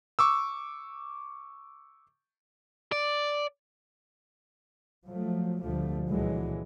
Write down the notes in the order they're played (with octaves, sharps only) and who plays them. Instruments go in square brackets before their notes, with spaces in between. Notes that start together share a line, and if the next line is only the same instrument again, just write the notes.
[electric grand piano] C#6 D6 E6
[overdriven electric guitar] D5
[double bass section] F3 F#3 A3
D2 B2 D3 F3 G3 A3
C#2 A#2 D3 E3 F#3 G#3